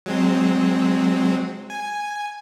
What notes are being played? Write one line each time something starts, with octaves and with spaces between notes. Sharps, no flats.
F#3 G#3 C4
G#5